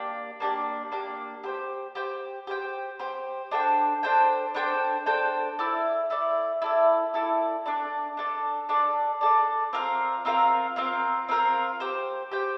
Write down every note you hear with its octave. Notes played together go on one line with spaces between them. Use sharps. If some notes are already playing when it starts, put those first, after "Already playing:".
Already playing: A#3 D4 G4 D5
A#3 D4 G4 D5
A#3 D4 G4 D5
G4 C5 G5
G4 C5 G5
G4 C5 G5
G4 C5 G5
D4 A4 C5 G5
D4 A4 C5 G5
D4 A4 C5 G5
D4 A4 C5 G5
E4 A4 D5
E4 A4 D5
E4 A4 D5
E4 A4 D5
D4 A4 D5
D4 A4 D5
D4 A4 D5
D4 A4 D5
C4 F4 A#4 F5
C4 F4 A#4 F5
C4 F4 A#4 F5
C4 F4 A#4 F5
G4 C5 G5
G4 C5 G5